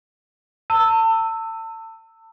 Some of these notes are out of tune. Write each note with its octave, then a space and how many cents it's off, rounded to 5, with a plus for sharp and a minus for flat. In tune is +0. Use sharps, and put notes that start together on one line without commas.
A5 +35 E6 +0